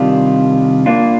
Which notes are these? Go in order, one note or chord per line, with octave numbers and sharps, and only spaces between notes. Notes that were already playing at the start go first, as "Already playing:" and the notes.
Already playing: C3 D#3 G3 D4 F4
A#3 D4 F4